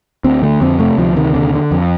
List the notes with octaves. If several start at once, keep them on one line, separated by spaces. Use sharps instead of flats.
D2 C4
D3 A3
F2 C4
C3 A3
D2 F3
C3 D#3
D#2 D3
D3
F2